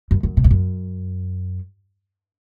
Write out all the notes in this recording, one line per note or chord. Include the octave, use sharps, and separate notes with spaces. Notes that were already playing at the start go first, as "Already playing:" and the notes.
F#2
F#2
B2
E2
F#2